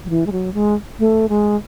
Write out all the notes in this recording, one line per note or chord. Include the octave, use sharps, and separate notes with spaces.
F#3
E3
G#3
F#3
G#3
A3
G#3